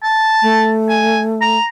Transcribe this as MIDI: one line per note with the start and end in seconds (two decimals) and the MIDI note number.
0.03 0.71 81
0.42 1.58 57
0.89 1.21 80
1.41 1.65 82